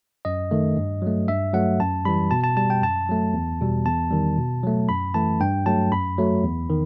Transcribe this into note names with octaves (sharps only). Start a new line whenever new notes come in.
F#2 D#5
D#3 A3
G2
F#3 A3
G2 E5
F#3 A3 F#5
F#2 A5
E3 G3 B5
B2 A5
A5
G3 A5
G5
F#2 A5
F#3 A3
E2
B2 G3
E2 A5
D#3 G3
B2
F#3 A3
F#2 B5
E3 A3 A5
G2 G5
F#3 A3 A5
F#2 B5
F#3 A3
E2
D#3